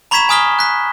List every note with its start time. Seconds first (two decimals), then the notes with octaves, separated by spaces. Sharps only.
0.11 A#5 B5 C#6 G#6 B6 E7
0.29 G#5 A#5 D#6 F6 B6 G7
0.59 F#6 B6